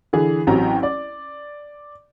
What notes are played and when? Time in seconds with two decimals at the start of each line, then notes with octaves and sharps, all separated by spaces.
0.13 D3 E3 G#4
0.47 A1 F#3 C4 G4 A#5
0.83 D5